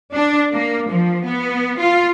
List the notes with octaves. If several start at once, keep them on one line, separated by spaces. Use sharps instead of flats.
D4
A#3
F3
B3
F4